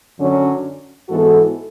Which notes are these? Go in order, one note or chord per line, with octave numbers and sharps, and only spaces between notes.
F#2 D3 F#3 C#4
G#2 E3 B3 F#4 A4